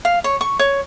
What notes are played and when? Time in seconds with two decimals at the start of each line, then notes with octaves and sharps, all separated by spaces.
0.05 F5
0.24 C#5
0.41 C#6
0.59 C#5